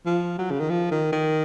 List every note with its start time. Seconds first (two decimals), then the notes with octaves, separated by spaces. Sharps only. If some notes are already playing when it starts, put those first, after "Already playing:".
0.06 F3
0.39 F#3
0.51 C#3
0.60 D#3
0.70 F3
0.91 D#3
1.12 D#3